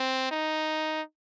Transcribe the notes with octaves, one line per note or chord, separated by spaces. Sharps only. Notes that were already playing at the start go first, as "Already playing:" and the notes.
Already playing: C4
D#4